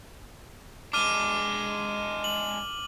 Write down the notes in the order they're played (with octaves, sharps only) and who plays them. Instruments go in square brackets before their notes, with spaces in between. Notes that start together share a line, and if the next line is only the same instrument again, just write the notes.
[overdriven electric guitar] G#3 D4 [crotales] D6 F6 D#7
[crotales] F#7